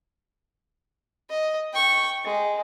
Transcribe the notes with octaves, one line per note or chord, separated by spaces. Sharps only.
D#5
G5 C#6
G#3